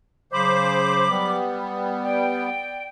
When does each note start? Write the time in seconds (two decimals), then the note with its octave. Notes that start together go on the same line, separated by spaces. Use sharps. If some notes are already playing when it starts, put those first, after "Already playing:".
0.32 C#3 F#3 C5 B5 D6
1.09 G3 B3
2.03 D5 G5